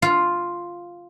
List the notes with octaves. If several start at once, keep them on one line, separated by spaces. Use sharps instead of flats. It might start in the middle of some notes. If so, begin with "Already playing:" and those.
F4